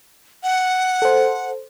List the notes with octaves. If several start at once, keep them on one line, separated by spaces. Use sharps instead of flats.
F#5
A4 C5